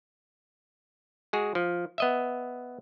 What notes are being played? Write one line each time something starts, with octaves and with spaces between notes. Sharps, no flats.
G#3 F#4 G#4
F3
B3 D#5 E5